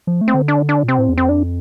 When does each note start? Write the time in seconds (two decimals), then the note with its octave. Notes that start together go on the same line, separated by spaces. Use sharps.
0.07 F3
0.21 A3
0.28 C4
0.34 D3
0.48 D4
0.69 D4
0.84 A#2
0.88 C3 C4
0.98 A2
1.08 E2
1.18 F2 C4
1.29 D4